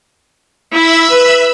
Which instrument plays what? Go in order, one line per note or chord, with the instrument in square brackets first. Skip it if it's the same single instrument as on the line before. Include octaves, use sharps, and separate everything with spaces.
[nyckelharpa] E4 [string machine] E5 B5 E6
[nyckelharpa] B4